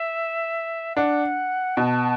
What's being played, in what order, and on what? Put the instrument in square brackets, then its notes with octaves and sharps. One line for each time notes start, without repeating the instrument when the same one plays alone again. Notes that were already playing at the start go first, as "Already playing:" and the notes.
Already playing: [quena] E5
[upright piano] D4 [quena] F#5
[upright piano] B2 [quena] A5